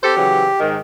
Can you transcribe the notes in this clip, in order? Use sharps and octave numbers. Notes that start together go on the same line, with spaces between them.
C4 G4 A4 C5
C#3 E3 F#3
G#2 D#3